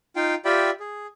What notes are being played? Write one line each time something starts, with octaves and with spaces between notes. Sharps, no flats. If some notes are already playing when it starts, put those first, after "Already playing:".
D#4 F4 F5 G5
F4 G4 D5 E5 G5 B5
G#4